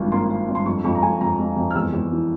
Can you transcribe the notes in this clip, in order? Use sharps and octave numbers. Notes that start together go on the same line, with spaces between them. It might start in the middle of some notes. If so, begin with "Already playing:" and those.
Already playing: G#1 G2 F3
A#3 C6
A#3
G2
C6
F2 C#6
F2 C#6
A#5
F2 G#5
F2 A#5
F2
F2
F6
E2 E6
E2
E3